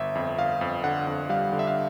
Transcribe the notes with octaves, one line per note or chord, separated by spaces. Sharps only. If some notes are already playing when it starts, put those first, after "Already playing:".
Already playing: G1 E5
F2
G1 F5
F2
D3 F#5
F2
G3 F5
D3
E5
F5